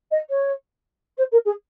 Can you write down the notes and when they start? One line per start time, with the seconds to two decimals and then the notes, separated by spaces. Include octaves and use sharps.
0.11 D#5
0.29 C#5
1.17 C5
1.32 A#4
1.45 G#4